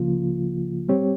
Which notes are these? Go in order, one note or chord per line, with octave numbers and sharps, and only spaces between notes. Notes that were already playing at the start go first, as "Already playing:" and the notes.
Already playing: C#2 C#3 F3 A#3 F4
G3 C4 G4 C#5